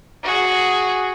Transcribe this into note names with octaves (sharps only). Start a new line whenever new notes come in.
F#4 G#4